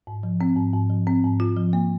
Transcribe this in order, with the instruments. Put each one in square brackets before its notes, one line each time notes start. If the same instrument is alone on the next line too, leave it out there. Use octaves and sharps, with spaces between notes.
[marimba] G#2
F3
C4
G#2
G#2
F3
C4
G#2
F4
F3
A#3